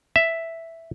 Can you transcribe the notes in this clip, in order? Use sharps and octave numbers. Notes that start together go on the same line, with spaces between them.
E5